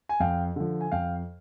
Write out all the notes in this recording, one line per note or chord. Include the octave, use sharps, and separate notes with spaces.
G#5
F2 F5 G5
D3 F3
G#5
F2 F5 G5